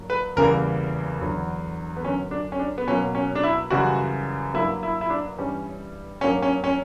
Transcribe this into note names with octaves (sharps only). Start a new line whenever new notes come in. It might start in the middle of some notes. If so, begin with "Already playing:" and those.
Already playing: G2 F#3 A#3
B4
E2 C#3 E3 G3 A#3 A#4
E2 D3 F#3
B3
F#2 D3 F#3 C#4
D4
C#4
D4
B3
B2 F#3 A#3 C#4
C#4
D4
E4
F#2 C#3 E3 G3 F#4
G2 F#3 A#3 E4
E4
E4
D4
G2 E3 G3 C#4
G2 F#3 A#3 C#4
C#4
C#4